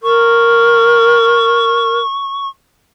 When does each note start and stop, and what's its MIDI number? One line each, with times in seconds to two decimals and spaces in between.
0.03 1.99 70
0.03 2.48 85